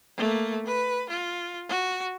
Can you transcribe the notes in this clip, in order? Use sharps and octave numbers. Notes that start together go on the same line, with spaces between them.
A3 A#3
B4
F4
F#4